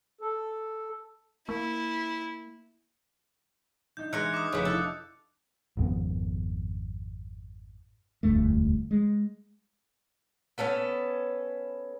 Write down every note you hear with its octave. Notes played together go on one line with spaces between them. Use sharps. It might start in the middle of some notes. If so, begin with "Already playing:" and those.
A4
A#3 E4
D4 D#4 G6
E3 G#3 A#4 F#6 C#7
D6 D#6
F1 C#3 E3
D4 E4 A4
G#1 F2 B2 B3
E1 D2 G2 A3
G#3
B3 C#4 A4 B4